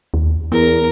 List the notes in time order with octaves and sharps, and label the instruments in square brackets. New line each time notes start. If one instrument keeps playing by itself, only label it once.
[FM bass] D#2
[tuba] E2 [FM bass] B3 [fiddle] A#4